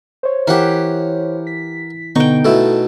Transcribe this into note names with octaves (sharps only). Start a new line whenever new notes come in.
C5 C#5
E3 G4 A#4 F#5
B6
B2 D3 B3 D#4 G5 C#6
B2 A3 E4 A4